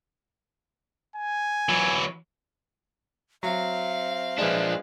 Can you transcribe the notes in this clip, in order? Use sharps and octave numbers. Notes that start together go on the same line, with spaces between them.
G#5
E3 F#3
F#3 C4 E5 F5
F3 G#3 D4 B4 E5